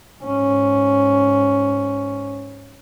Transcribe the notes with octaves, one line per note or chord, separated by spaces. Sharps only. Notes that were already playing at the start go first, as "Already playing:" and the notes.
G#2 C#4